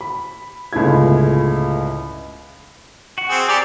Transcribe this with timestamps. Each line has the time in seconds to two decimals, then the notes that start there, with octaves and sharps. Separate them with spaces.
0.01 B5
0.73 G1 C#2 A2 E4 F4 G#6
3.18 F#4 F#5
3.29 C4 G#4
3.48 G4 G#4 D5 A#5 D6